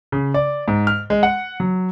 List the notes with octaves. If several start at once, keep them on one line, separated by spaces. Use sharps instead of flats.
C#3
D5
G#2
F6
G#3
F#5
F#3